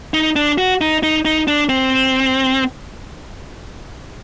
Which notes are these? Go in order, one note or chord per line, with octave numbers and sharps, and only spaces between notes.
D#4
D4
F#4
D#4
D#4
D#4
D4
C4